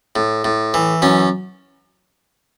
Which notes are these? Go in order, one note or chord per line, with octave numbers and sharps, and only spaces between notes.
A2
A2
E3
F#2 C#4